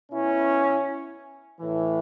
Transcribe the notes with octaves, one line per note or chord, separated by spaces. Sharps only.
B2 C#4 E4
A2 E3